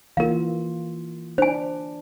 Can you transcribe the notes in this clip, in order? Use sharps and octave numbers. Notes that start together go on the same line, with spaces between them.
E3 A#3 F4 A#4 F5
D4 C5 G#5